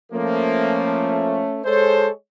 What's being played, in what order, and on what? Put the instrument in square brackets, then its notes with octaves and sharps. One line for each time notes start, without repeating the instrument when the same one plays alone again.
[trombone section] F3 A#3 [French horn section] A3 C#4
[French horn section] G#3 C#5 [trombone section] A4 C5